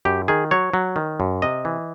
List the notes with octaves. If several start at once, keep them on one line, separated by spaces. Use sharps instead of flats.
F#2 G4
D#3 G#4
F#3 C#5
F#3
D#3
F#2
C3 D#5
E3